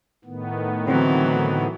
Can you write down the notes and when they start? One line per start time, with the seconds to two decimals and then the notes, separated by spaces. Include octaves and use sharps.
0.25 A2 D#3 B3
0.87 D3 E3 F#3 C4